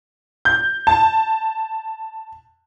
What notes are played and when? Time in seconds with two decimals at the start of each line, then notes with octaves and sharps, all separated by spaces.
0.45 G6
0.87 A5